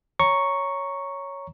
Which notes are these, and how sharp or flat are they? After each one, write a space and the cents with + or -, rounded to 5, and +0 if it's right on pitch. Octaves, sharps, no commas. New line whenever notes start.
C#5 +0 A#5 +0 C#6 +0